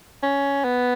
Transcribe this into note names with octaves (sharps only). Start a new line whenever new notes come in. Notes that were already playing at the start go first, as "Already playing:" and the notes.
C#4
B3